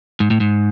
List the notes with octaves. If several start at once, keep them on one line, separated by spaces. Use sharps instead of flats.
G#2
A2
G#2